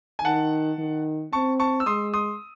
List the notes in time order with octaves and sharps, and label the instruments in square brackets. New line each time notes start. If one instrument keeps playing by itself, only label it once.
[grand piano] G#5
[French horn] D#3 [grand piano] F#5 A5
[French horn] D#3
[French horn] C4 [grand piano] A5 C#6
[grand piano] A5 C#6
E6
[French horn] G#3 [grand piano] C6 D#6
[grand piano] C6 D#6